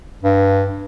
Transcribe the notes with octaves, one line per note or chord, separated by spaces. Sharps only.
G2